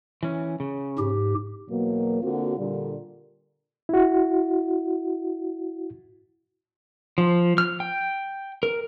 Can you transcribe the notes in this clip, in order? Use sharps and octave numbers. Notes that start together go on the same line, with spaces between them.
E3 C#4
C#3
G#2 G4
E2 B2 F#3 A#3
D3 A#3 C4 F4 F#4
A#2 D3 G3
E4 F#4
F3
F6
G5
A#4